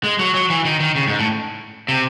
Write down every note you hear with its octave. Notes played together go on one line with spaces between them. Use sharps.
G#3
F#3
F#3
E3
D#3
D#3
C#3
G#2
A2
C3